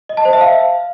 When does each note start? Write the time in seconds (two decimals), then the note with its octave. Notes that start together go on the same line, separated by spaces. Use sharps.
0.09 D#5
0.17 A5
0.25 C5
0.33 E5
0.41 F5